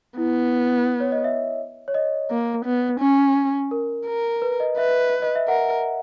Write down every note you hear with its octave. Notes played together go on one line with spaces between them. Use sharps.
B3 E4
C#5
D#5
E5
C#5
D#5
A#3
B3
C#4
A#4
A#4
B4
D#5
B4 E5
D#5
E5
A#4 F#5